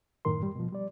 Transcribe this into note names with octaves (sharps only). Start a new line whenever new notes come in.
F#2 A2 D#3 A#4 C6
G3
B2 F3
G3 D5